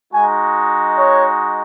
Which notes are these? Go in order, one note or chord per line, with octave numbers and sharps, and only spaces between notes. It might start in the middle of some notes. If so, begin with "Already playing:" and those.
G#3 D#4 F#4 G#5
C#5